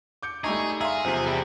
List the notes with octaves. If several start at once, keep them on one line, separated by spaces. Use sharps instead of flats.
D6 G6 C#7
G3 A3 D#4 G#4 A#5 C#6
G#4 E5 F5 A#5 C6
E2 C3 F3 C4
G3 E4 G4 G#4